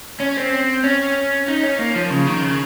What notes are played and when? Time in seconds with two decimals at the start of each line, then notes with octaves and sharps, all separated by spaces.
0.20 C#4
0.37 C4
0.84 C#4
1.48 D#4
1.64 C#4
1.79 A#3
1.95 F3
2.11 C#3
2.27 D#3
2.42 C#3